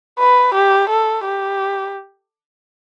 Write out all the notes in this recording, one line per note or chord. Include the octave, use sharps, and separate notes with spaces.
B4
G4
A4
G4